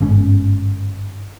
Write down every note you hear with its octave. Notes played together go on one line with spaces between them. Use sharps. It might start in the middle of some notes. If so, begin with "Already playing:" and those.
G1 G#2 C#4